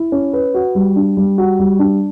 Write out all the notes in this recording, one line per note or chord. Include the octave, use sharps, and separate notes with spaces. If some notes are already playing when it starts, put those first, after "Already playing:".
Already playing: E4
C#4
B4
F#4
G3
D4
G3
F#4
G3
D4